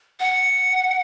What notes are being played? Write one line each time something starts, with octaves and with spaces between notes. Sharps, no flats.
F#5